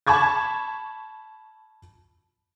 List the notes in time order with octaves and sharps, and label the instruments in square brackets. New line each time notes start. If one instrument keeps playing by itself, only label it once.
[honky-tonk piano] A5 B5 C#6 G#6 A6